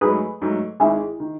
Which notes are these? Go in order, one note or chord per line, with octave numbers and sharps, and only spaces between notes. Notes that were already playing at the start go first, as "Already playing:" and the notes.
G#2 F#3 A3 G#4 B4
G#2 F#3 A3
G#1 G#2 D#3 E4 G#4
D#3